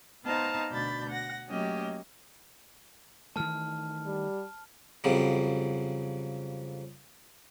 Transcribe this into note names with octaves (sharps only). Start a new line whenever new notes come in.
B3 D#4 C5 F5 A5 A#5
D2 B2 D4 B5 G6 A6
F#5 A#6
F#3 A3 A#3 C#4 G4 D#5
D#3 E3 A3 A5 F6
G3
F2 C#3 F#3 G3